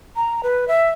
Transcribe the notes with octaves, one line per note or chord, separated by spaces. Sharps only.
A#5
B4
E5